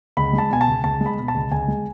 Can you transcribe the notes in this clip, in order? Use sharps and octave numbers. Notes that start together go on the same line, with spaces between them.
C#2 B5
G#3
A5
B2 G#5
A5
C#2
C#2 A5
G#3
B5
B2
A5
C#2
C#2 G#5
G#3